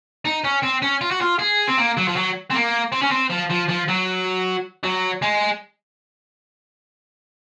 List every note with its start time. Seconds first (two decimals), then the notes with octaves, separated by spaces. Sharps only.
0.25 D#4
0.44 C#4
0.63 C4
0.82 C#4
1.01 F4
1.11 F#4
1.21 F4
1.39 G#4
1.68 C4
1.78 A#3
1.97 F#3
2.08 F3
2.16 F#3
2.50 C4
2.54 A#3
2.92 C4
3.02 C#4
3.11 C4
3.30 F3
3.50 F3
3.69 F3
3.88 F#3
4.84 F#3
5.22 G#3